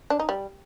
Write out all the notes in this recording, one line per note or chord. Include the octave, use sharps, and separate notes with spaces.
D4
D#4
G3